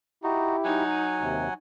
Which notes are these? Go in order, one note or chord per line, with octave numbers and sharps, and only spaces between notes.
D#4 E4 F#4 G4
F#3 D#4 F#5 G#5
D#2 C3